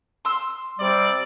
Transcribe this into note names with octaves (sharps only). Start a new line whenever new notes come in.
C6 E6
C3 G3 C4 D5